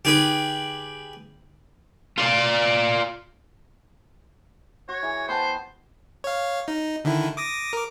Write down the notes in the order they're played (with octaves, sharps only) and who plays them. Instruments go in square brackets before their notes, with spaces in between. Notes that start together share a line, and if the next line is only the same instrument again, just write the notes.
[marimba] D3 D#4 [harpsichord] G4 G#4 B4
[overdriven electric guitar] F4 D5
[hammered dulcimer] F#4 [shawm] C#5
[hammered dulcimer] E3 G#4
[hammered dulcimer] B3 G5 A5 [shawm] C5
[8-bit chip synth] C#5 F5
D#4
D3 D#3 E4
D6 D#6 A#6
A#4 D6